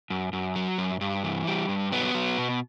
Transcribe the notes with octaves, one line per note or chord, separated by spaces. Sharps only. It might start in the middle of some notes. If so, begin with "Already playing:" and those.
F#2
F#2
F#3
F#2
G2
E3
G3
G2
F#3 B3
F#3
B2